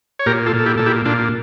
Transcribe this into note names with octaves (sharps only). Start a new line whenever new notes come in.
C#5
A#2 G4 A#4
F4 A4
A#2
A4
E4 G4
A#2 A4
E4 G4
A#2 D4 F4